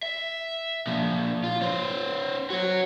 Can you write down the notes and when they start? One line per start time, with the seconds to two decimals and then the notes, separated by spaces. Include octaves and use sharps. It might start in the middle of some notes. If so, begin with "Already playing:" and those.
0.03 E5
0.87 A#2 F3
1.44 F4
1.61 C#4 C5
2.50 F#4 C#5